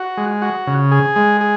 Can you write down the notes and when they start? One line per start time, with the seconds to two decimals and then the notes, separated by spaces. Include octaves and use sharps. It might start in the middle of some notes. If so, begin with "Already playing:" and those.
Already playing: F#4
0.17 G#3
0.42 F#4
0.67 C#3
0.92 G#4
1.16 G#3
1.41 G#4